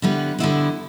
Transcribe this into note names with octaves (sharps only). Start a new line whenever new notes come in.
D3 G3 B3 E4 B4
D3 G3 B3 E4 B4